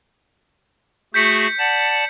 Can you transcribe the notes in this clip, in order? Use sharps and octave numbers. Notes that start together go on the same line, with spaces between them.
A3 F#4 G#4 G6 B6 C#7
D5 F#5 A5